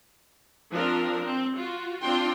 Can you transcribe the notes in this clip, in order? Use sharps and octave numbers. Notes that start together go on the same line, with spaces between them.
F3 C4 D4 A#4
C4
F4 F#4
C4 D4 F4 G5 C6